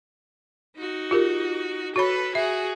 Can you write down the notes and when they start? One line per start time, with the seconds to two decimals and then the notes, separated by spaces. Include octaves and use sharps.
0.77 D#4 F#4
1.11 F4 G4 A#4
1.96 F#4 A4 B4 C#5 B5
2.35 F#4 G#4 E5